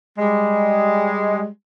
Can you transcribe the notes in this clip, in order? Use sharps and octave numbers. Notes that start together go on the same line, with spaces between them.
G3 G#3